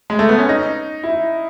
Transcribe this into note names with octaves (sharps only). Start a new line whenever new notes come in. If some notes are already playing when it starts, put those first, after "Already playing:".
G#3
A3
B3
C#4
D#4
E4